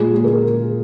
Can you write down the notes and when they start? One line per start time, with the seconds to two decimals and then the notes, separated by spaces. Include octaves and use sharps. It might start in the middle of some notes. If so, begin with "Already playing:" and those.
Already playing: A#2 G#3 G#4
0.15 G#4
0.24 A#4